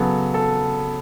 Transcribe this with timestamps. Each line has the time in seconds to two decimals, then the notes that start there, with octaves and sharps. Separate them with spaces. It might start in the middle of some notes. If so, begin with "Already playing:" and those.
Already playing: C#3 F#3 B3 A4
0.34 A4